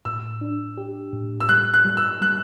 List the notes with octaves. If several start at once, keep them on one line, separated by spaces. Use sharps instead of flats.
A2 E6
D4
G4
A2
E6
G3 F#6
F#6
G3
E6
G3 F#6